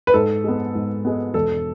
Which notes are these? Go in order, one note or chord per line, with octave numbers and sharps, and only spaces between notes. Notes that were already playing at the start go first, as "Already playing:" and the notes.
B4
G#2 A4
G#3 B3
G#2
G#3 B3
E1 A4